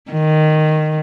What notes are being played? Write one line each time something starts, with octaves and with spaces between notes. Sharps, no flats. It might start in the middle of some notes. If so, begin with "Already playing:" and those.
D#3